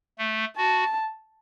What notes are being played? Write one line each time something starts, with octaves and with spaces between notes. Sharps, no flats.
A3
F#4 A5